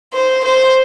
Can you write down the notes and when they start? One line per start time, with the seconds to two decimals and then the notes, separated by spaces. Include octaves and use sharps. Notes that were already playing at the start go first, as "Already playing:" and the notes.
0.14 C5
0.44 C5